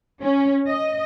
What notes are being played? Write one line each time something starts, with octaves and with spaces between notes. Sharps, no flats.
C#4
D#5